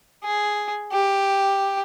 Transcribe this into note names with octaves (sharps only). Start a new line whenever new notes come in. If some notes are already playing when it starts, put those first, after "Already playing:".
G#4
G4